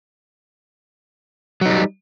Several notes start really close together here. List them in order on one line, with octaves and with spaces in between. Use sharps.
F#3 D#4 G3